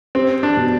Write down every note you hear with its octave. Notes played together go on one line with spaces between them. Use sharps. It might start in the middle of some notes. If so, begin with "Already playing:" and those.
C4 G4
D4
B2